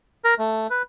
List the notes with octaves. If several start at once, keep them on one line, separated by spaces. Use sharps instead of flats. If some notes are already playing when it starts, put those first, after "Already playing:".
A#4
A3
B4